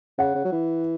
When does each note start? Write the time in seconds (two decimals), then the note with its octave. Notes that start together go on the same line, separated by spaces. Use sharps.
0.18 C#3 F#5
0.35 C#3
0.45 F#3
0.52 E3